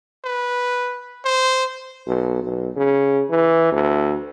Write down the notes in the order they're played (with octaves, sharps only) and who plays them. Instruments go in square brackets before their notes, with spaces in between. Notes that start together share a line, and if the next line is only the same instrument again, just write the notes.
[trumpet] B4
C5
[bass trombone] B1
B1
C#3
E3
D2